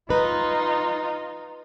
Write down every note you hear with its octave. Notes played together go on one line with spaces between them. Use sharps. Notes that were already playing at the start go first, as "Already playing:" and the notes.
D#4 F4 B4